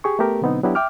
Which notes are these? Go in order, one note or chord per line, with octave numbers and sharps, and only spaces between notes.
G4 G#4 C#6
A3 B3 G4 A#4
B2 D3 F#3 B3 C4 D#4
F#3 B3 D4 E4 F#4 G4
E5 G5 D6 F6